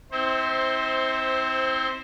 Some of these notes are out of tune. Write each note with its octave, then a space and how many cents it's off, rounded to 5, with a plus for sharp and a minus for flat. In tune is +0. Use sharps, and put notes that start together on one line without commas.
C4 +0 E4 -45 C5 +10